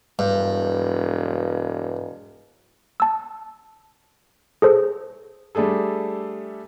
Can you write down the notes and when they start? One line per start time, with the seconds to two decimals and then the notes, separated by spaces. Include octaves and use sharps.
0.19 E1 G2
3.00 A5 E6
4.62 G#4 A4 C5
5.55 G3 A3 D4 G#4 A4